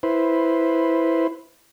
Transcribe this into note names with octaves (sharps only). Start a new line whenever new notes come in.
E4 B4 C5